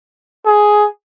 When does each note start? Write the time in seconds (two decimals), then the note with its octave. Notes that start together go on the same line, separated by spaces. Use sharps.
0.45 G#4